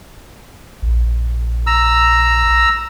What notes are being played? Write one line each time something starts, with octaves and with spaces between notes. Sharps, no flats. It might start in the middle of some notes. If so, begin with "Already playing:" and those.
A#1
A#5 E6